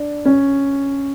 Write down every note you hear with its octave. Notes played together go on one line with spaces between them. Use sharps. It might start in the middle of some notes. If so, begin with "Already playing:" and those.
Already playing: D4
C#4